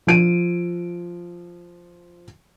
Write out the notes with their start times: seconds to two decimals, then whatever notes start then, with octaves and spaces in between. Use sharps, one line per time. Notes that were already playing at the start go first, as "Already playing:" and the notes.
0.07 F3 D7 D#7